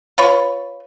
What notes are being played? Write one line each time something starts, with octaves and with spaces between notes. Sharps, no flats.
F4 B4 C#5